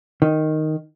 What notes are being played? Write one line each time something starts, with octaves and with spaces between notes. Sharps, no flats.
D#3